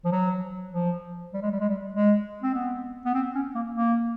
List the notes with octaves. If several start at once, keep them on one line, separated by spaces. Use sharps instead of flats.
F3
F#3
F3
G3
G#3
G3
G#3
G3
G#3
C4
B3
B3
C4
C#4
A#3
A#3